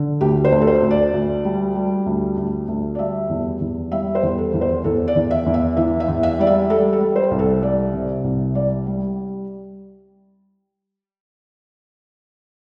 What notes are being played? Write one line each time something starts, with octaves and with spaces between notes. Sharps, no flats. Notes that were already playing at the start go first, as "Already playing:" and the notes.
Already playing: D3
D2 G4
C5
D2
A4
C5
D2
D5
D2
G3
G3
D2
D2
D2
D5
G3 E5
E2
E2
G3 E5
C5
E2
A4
E2
C5
E2 A4
D5
E2
E5
E2
E5
E3 E5
E5
E2
E5
G3 D5
E5
G3 A4
A4
G3
C5
C2
A4
G3 D5
C3
C2
G3 D5
G3